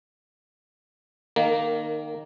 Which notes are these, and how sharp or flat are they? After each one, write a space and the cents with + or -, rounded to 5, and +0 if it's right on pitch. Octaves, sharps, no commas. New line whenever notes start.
D#3 -20 A#3 +0